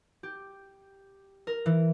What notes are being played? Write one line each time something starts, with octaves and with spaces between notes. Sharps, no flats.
G4
A#4
E3